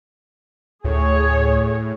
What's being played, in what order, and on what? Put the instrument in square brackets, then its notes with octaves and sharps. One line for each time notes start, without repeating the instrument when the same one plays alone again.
[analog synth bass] D2 [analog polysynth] A2 [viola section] G#4 C#5